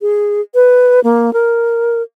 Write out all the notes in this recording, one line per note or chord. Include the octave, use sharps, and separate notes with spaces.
G#4
B4
A#3
A#4